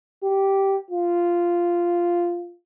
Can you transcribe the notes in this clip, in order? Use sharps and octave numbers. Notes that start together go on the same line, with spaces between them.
G4
F4